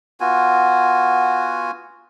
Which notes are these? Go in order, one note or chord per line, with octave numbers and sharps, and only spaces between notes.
B3 F4 F#4 G#5